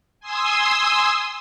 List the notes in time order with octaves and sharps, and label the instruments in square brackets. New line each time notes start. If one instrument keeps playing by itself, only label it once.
[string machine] G#5 C6 D#6 E6